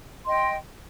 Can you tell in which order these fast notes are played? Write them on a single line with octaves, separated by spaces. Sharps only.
C6 D#5 G5